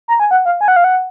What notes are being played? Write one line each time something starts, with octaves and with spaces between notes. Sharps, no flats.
A#5
G#5
F#5
F5
G#5
F#5
F5
F#5